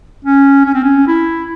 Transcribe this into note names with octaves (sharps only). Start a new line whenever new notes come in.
C#4
C#4
C4
C#4
E4